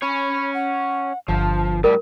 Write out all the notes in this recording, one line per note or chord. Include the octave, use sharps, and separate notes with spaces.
C#4 C#5 B5
F#5
G1 F3 A5
A2 G3 A#4 D5